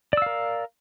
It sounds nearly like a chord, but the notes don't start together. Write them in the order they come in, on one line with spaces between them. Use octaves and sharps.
D5 E6 F5 A#4